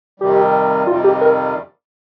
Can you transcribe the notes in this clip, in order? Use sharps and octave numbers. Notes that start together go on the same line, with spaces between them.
F2 C3 D#3 G3 G4
F2 C3 D#3 G3 F4
G4
A#4